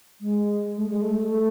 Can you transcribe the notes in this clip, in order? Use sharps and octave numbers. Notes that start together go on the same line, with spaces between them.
G#3
A3
G#3
A3